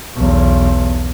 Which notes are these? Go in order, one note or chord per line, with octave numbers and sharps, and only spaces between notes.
B1 E2